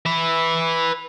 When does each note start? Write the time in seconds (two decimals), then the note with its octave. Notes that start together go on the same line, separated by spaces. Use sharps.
0.06 B4 E5